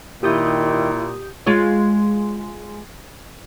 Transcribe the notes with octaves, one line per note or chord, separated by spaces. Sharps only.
A#2 D#3 E4 G4 D#6 G6
G#3 F4 C#5